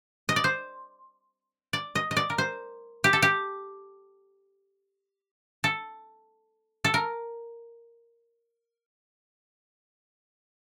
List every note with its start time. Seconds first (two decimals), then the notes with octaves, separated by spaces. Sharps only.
0.29 D#5
0.36 D5
0.44 C5
1.73 D5
1.95 D#5
2.11 D#5
2.17 D5
2.30 A#4
2.38 C5
3.04 G4
3.13 A4
3.22 G4
5.64 A4
6.85 A4
6.94 A#4